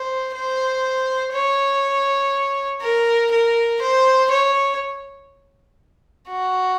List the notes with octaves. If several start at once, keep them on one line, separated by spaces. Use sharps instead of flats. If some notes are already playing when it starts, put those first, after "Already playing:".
Already playing: C5
C5
C#5
A#4
A#4
C5
C#5
F#4